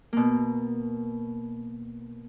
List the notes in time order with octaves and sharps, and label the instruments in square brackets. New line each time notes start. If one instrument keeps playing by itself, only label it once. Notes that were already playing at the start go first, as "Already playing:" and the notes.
[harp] B2 A#3